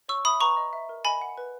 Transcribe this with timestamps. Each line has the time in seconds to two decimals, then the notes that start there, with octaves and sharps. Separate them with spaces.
0.08 C#5 C#6 E6
0.25 E5 B5 D#6
0.41 B4 A#5 C#6
0.57 D#5
0.73 E5
0.89 A#4
1.04 D#5 G#5 B5
1.22 F#5
1.38 B4